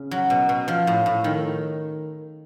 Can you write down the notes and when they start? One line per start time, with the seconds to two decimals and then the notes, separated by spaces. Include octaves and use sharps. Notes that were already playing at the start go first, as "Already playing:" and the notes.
Already playing: C#3
0.11 F#3
0.30 B2
0.49 B2
0.68 F3
0.87 A2
1.06 A2
1.24 D#3